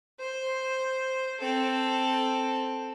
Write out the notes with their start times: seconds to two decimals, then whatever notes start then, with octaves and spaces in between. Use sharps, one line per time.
0.20 C5
1.40 C4 A4